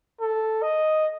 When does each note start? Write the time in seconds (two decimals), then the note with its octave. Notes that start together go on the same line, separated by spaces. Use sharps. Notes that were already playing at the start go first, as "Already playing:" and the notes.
0.20 A4
0.62 D#5